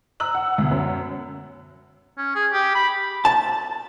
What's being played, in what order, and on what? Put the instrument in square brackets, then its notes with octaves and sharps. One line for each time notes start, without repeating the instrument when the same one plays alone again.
[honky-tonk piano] A#5 E6 F#6 F#7
F#5
D2 B2
F#2
[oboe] C#4
G#4
G4
B5
[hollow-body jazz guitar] A5